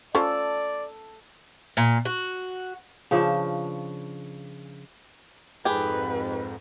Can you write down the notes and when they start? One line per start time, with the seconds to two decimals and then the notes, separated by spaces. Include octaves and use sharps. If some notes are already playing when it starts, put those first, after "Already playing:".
0.15 C#4 F4 A4 C5 D5
1.77 A#2
2.05 F#4
3.11 C#3 F3 D4
5.65 F2 G#2 G4 G#4 B4